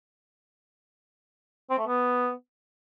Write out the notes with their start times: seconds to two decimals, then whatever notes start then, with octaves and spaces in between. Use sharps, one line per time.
1.70 C4
1.78 A3
1.87 B3